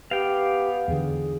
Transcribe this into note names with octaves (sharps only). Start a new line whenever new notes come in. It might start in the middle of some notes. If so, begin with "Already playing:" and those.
B3 G4 F5 G5
E2 D3 G#4